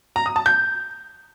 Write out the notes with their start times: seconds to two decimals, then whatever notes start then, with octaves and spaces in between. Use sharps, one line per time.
0.16 A#5
0.26 D#6
0.36 A5
0.46 G6